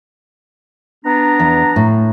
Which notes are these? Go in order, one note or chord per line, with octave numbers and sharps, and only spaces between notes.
B3 D4 A#5
E2
A2